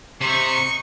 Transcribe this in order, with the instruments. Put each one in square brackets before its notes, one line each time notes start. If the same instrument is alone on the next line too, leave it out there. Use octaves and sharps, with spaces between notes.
[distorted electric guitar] C3 [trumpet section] D#4 C#6